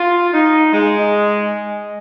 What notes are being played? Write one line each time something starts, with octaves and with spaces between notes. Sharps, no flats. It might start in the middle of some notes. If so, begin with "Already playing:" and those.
Already playing: F4
D#4
G#3